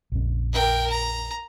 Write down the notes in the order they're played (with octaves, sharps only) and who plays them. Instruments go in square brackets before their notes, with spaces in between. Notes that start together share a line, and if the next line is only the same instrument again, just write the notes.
[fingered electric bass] A#1 F2 C#4
[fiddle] A#4 G5
A#5